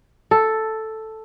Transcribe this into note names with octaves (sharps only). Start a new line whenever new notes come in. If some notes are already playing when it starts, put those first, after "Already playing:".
A4